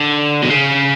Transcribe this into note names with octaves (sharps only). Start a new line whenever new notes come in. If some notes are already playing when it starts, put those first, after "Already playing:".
Already playing: D3
B2
C#3